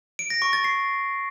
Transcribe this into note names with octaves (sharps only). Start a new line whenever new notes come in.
D7
A#6
C#6
A6
C7